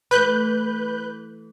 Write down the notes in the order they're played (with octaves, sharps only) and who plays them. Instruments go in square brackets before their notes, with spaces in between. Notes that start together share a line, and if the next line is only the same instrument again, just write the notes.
[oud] E3 A3 [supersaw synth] B4 F#6 G6